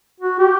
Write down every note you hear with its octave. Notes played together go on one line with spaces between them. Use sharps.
F#4
G4